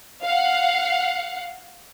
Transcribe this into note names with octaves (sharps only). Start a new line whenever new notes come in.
F5 F#5